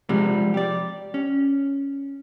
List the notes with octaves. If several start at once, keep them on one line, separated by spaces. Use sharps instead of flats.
C3 F3 G3 G#3
G4 D5
C#4